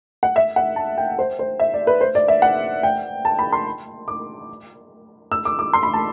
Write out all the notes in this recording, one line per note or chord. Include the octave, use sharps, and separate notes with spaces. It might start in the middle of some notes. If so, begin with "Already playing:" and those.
F#5
E5
F#5
A5
G5
C5
C5
E5
D5
B4
C5
D5
E5
F#5
G5
A5
B5
C6
D6
E6
D6
D6
C6
B5
A5